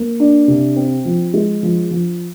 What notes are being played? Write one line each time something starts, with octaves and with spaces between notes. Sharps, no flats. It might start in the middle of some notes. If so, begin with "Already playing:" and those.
Already playing: A#3
D4
C3
C4
F3
G#3
F3
F3